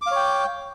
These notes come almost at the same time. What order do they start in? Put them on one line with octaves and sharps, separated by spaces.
D6 F5 C#5 G5